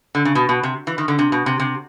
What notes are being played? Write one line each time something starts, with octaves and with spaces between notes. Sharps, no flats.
D3
C#3
B2
B2
C3
E3
D#3
D3
C3
B2
C3
C3